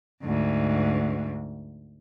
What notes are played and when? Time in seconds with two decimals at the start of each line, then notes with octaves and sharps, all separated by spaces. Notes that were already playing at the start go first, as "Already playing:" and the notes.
0.22 D2 G#2